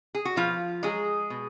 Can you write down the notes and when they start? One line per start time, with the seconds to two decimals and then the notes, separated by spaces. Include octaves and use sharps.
0.15 G#4
0.25 F#4
0.36 B2 F3 F4
0.83 F#3 G#3 G#4
1.30 B2